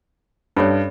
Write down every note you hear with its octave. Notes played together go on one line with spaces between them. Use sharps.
G2 C#4 A4 C#5